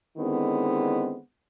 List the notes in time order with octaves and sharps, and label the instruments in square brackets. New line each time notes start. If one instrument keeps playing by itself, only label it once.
[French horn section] D3 D#3 G#3 B3 C4 E4